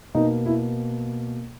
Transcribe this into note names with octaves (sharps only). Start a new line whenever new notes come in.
B2 A#3 D#4
E4